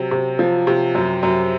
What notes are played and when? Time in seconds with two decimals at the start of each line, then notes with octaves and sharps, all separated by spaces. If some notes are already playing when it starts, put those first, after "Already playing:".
Already playing: C3 F#3
0.11 C3
0.39 F3
0.67 C3
0.95 F#2
1.23 F#2